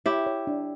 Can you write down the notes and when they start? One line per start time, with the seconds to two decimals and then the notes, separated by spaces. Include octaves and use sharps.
0.06 E4 G4 C#5
0.27 C#5
0.47 D4